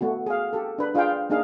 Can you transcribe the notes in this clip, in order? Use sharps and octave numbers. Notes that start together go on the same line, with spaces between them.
A3 B3 F#4
G#4 F5
G4 A4
D4 B4
D4 F4 G#4 F5 G5
A#3 D4 D#4 G#4 F5